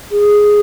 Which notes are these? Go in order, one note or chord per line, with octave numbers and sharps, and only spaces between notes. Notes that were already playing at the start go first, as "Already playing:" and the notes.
G#4